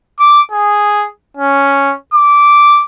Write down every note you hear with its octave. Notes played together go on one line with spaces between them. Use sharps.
D6
G#4
C#4
D6